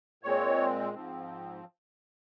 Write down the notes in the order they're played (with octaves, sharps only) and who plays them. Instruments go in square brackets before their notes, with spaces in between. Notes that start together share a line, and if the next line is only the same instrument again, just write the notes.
[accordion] A#2 G#3 C4 C#5
G#2 F3 C4